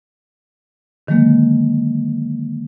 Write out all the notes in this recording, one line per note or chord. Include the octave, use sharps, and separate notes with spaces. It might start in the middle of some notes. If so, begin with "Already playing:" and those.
D3 D#3 F#3 G#3 A#3